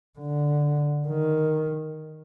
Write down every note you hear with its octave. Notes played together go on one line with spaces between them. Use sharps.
D3
D#3